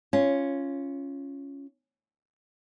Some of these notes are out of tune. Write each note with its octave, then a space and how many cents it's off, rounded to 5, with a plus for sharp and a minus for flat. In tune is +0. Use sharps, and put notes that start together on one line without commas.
C#4 +0 F4 -15